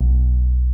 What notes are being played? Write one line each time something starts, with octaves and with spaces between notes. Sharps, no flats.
B1